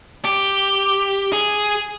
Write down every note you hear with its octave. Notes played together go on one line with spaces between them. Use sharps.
G4
G#4